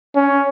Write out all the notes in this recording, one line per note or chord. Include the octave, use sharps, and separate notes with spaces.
C#4